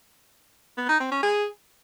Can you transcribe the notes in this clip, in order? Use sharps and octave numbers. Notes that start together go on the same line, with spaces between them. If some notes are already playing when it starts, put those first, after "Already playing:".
B3
D#4
C4
C#4
G#4